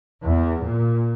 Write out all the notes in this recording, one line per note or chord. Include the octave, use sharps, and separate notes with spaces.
E2
A#2